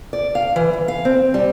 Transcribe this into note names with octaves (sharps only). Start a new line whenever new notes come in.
D5
F5
E3
E3
F5
C4
G3